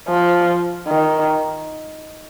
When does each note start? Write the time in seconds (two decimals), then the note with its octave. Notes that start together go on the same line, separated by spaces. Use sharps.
0.09 F3
0.88 D#3